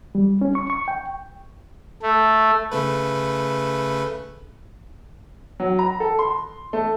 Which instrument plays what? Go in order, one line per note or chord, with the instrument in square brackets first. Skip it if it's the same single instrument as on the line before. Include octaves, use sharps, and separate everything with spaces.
[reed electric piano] G3
C#4
C#6
C#6
G5
[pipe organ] A3
[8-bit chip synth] C#3 A3 B4
[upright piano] F#3
A#5
A4
C6
A3